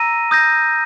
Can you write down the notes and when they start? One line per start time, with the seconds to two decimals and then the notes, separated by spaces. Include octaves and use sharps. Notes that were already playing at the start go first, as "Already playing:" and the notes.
Already playing: A#5 E6 A#6 D#7
0.31 D#6 G6 A#6